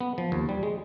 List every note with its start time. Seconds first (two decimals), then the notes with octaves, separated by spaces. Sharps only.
0.01 B3
0.18 F3
0.32 D#2
0.49 G3
0.63 G#3